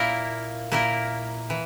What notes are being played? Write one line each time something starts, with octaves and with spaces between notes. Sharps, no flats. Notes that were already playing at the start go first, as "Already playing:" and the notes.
Already playing: A#2 A#3 E4 A#4
A#2 A#3 E4 A#4
E3